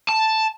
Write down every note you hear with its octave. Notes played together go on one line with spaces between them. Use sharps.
A5